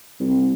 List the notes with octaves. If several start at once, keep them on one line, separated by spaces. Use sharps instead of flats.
C2